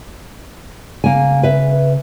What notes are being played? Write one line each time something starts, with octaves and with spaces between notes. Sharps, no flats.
C#3 A#3 G#5
B4 E5